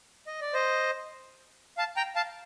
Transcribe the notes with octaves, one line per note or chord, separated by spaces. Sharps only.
D#5
D5
C5 D#5
F5 A5
G5 A#5
F5 A5